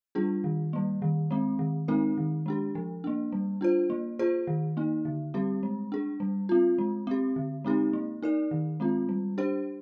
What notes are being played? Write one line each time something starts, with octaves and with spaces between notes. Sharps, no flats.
G3 D4 F4 G#4
D#3
G3 A#3
D#3
G#3 C4
D#3
G#3 C4 D#4 A#4
D#3
G#3 D4 G4
F3
A#3 D4
G3
D4 F4 C5
A#3
F4 G#4 C5
D#3
A#3 D#4
D3
G3 C4 G4
G#3
D4 G#4
G3
C4 F4
G#3
C4 G4
D3
G#3 C4 D#4 G4
A#3
D#4 A#4 D5
D#3
G#3 C4 F4
G3
D4 G4 C5